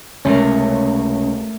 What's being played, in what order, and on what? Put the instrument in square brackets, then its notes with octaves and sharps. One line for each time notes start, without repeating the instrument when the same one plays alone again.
[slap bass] C#2 C3 [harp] A3 A#4 [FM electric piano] C#4